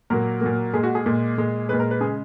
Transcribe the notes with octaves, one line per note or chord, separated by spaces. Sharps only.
A#2 F#3 A#3 A#4
A#2 F#3 A#3
A#2 G#3 G#4
F#4
G#4
A#2 G#3
A#2 G#3
A#2 G#3 B4
A#4
B4
C#3 G#3 G#4